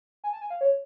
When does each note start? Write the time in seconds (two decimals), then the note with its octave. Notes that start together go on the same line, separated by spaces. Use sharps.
0.24 G#5
0.33 A5
0.41 G#5
0.50 F5
0.61 C#5